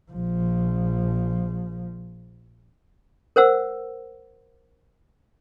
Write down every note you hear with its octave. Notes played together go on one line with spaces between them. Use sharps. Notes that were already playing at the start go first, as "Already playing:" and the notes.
A#1 F3
A#4 C5 F#5 E6